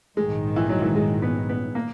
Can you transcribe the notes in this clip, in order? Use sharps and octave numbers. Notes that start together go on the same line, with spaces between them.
A#1 G#2 D#3 G#3
E3
F#3
E3
G#3
B3
B3
A#3